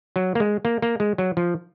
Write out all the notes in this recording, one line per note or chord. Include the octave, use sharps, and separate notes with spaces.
F#3
A#3
G#3
A#3
A#3
G#3
F#3
F3